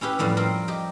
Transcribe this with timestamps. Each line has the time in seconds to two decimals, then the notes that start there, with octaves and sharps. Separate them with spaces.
0.01 C#4 E4 G4 B4
0.19 F2 A2 G3 B3
0.37 C4 A#4
0.68 G4 D#5